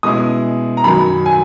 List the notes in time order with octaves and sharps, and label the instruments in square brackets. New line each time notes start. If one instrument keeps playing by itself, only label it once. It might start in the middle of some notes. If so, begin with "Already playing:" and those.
[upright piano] B2 G#3 C#4 E4 D#6
A#5
F#2 D#3 F#3 B5
G#5